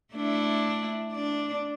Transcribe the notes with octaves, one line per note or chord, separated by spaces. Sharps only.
A3 D4 E4
D4 D5